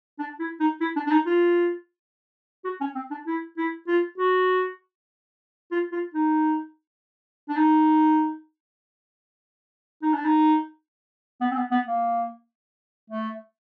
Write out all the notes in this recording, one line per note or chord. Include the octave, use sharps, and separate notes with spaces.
D4
E4
D#4
E4
D4
D4
D#4
F4
F#4
C#4
C4
D4
E4
E4
F4
F#4
F4
F4
D#4
D4
D#4
D#4
D4
D#4
B3
C4
B3
B3
A#3
A3